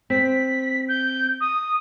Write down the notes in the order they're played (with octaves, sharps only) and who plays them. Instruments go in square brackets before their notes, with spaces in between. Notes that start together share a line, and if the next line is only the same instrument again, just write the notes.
[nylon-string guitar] C4 [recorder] B6
[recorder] G6
D#6